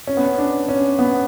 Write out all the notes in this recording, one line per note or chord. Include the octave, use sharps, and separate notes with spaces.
C#4
B3
C#4
D4
C#4
B3